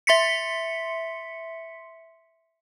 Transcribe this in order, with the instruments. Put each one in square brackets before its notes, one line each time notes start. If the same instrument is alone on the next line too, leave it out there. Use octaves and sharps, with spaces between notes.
[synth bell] E5 C6 B6 C#7